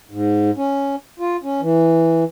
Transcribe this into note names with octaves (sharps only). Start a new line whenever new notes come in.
G#2
C#4
F4
C#4
E3